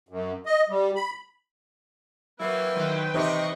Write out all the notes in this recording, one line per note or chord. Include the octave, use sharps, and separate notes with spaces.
F#2
D#5
G3
B5
E3 F#3 A#3 E4 B4 G5
D#3 F#3 C5
C3 E3 D#4 C5 D#5 C#6